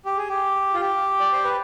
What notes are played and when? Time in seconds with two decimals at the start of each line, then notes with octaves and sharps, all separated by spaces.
0.06 G4
0.17 G#4
0.29 G4
0.74 F4
0.81 G4
1.20 D5
1.32 C5
1.44 B4